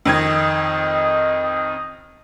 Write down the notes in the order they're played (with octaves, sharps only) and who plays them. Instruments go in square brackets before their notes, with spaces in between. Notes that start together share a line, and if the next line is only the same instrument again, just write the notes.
[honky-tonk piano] F2 D#3 G#6 [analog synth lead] D#5